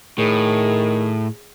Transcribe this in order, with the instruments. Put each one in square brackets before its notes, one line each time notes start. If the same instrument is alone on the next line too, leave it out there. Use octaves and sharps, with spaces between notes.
[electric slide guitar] A2 [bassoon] D#3 [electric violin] G#4